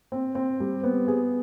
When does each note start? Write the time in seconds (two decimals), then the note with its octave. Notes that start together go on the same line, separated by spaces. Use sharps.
0.12 C4
0.35 C4
0.60 G3
0.84 B3
1.08 G#4